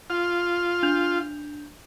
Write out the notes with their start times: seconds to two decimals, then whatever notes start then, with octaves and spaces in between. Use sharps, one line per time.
0.10 F4
0.83 D4 G6 F7